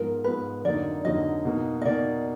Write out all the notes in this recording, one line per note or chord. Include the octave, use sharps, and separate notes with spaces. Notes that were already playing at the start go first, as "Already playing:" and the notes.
Already playing: G#2 F3 B3 A#4
G#2 F3 B3 B4
F2 D3 F#3 A#3 D#4 D5
F2 D3 F#3 A#3 D#4 D#5
B2 A#3 D#4
D#5
B2 A#3 D#4 D5